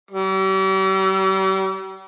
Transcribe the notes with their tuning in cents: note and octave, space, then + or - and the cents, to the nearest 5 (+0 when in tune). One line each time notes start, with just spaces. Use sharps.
G3 -40